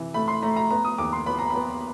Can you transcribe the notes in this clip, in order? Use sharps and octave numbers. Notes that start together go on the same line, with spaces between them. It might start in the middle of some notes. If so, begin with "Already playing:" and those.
Already playing: C3 E3
A3 B5
C6
A3 A#5
A#5
B3 A#5
D#6
D#2 D6
C6
B3 B5
A#5
B3 B5